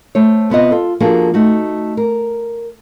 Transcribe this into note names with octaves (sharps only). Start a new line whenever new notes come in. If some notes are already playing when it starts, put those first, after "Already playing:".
A3 C5 C#5
C3 B3 F4 D#5
F4 A4
F3 A#3 D4 F#4 G#4 A4
A3 D#4 F#4
A#4